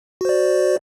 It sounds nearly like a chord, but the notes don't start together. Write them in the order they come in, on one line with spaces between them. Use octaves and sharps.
F#4 C5 D5